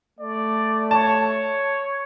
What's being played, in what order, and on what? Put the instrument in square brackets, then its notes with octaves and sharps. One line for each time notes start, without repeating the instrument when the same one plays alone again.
[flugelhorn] A3 [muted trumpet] D5
[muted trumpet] C#5 [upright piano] A5